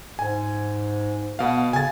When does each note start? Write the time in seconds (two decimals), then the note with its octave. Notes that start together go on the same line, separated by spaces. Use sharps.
0.19 G#2 G#5
1.39 B2 B3 F5
1.73 C#3 G#5 A6